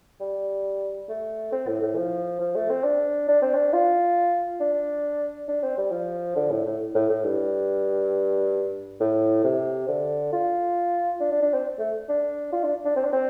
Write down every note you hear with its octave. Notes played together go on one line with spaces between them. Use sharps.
G3
A3
C4
A2
A2
F3
F3
A3
C4
D4
D4
C4
D4
F4
D4
D4
C4
G3
F3
D3
A2
A2
A2
A2
G2
A2
C3
D3
F4
D4
D4
D4
C4
A3
D4
F4
D4
D4
C4
D4
C4